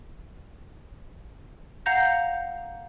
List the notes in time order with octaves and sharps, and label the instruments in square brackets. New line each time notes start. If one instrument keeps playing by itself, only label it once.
[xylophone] F5 F#5 A#5 G6 A#6